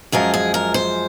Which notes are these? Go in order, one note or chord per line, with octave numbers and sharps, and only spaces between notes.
F#2 F3 G#3 A#4
G#4
A#4
C5